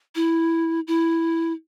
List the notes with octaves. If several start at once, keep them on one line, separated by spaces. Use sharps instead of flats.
E4
E4